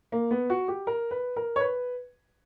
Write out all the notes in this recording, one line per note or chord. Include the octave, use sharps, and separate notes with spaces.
A#3
B3
F#4
G4
A#4
B4
A#4
C#5
B4